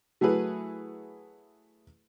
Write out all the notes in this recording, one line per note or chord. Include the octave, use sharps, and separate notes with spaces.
F#3 A3 E4 G#4 B4